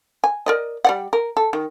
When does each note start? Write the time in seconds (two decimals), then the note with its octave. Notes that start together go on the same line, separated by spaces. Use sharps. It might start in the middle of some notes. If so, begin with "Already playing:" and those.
0.24 G#5
0.46 A#4 D5 D#5
0.85 G3 D5 F#5
1.13 A#4
1.37 A4
1.53 D#3